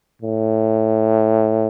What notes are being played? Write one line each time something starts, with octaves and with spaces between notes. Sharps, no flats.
A2